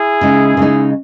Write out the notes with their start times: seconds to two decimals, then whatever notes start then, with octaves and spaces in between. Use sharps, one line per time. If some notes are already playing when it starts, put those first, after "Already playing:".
Already playing: E4 G#4
0.21 C#3 G#3 D#4
0.57 C#3 G#3 D#4